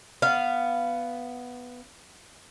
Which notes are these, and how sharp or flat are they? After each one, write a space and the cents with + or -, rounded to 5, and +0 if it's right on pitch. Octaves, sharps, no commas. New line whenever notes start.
B3 +0 F5 -15